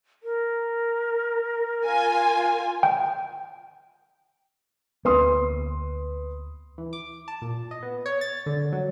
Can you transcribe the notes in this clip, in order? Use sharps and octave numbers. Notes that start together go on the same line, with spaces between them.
A#4
F4 G#5
G5
D2 A#3 B3 B4 C6 D#6
E3
D6
A5
A#2
D#5
B3
C#5
A6
D3
F#3